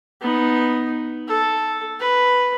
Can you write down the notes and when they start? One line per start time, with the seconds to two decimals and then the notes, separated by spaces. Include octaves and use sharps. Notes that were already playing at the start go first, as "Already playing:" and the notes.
0.21 B3 D#4
1.28 A4
2.00 B4